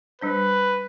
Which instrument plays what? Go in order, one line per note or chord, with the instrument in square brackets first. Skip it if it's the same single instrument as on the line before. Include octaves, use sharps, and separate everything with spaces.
[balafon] G3 D4 C5 [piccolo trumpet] B4